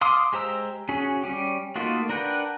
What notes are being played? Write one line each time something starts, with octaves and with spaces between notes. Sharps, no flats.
F5 C6 D6 D#6
G#3 G4 C5 A#5 E6
C#4 F#4 G#4
G3 C#4 G4
A3 A#3 D#4 F4 F#4
D4 A#4 B4 F#5 G5